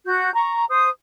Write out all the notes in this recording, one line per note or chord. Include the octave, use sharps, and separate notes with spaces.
F#4 G6
A#5 C#6
C5 D#6